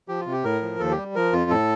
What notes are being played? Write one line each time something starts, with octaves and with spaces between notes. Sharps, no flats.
F3 G4
F4
C3
G4
A2 A#4
F3
D#2 A4
G4
G3
F3 A#4
F2 F4
A2 A4